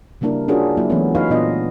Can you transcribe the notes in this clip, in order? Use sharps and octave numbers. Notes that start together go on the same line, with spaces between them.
C#3 G3 A#3 D4 E4 A#4
C#4 D4 F4 F#4 G#4 A#4
F#3 A#3 E4
E3 F#3 G#3 A3 B3 C#4
D#4 F4 B4 C#5 F5
A#2 B3 D4 F4 D#5